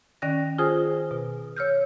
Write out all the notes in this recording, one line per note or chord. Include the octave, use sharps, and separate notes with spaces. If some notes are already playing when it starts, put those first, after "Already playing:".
D#3 C#4 D5 G5 F#6 A#6
F4 G#4 C5 G#5 D#6
B2
C#5 E6 F6 G6